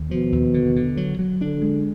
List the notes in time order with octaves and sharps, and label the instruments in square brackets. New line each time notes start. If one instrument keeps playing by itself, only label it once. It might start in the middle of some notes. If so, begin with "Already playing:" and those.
Already playing: [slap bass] D#2
[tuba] B2 [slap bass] F3
[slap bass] D#2
D3
D3
F#3
F#3
[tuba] D3 [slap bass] D4
[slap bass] G#3